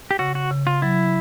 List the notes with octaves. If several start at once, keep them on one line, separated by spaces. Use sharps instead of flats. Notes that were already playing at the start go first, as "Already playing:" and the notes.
G4
C#3 F#4
F#4
C#3
F4
F#3 E4